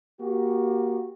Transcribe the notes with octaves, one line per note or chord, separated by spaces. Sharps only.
A#3 F#4 G4